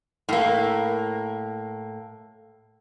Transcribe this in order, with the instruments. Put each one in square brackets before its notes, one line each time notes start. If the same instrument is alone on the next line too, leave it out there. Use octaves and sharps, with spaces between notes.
[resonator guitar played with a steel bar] A2 A#3